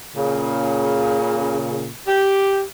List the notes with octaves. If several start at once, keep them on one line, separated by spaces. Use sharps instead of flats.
A#2 C#3
G4